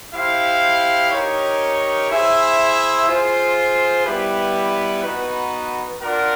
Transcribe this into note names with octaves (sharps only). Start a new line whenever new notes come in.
E4 G4 C5 F5
D#4 G4 A#4 C#5
E4 G#4 C5 E5
F4 G#4 C5
G3 B3 E4 G4 B4
B3 D#4 F#4 B4
D4 F4 A#4 D5 F#5